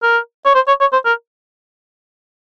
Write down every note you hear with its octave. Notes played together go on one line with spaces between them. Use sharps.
A#4
C#5
C5
C#5
C#5
C5
A#4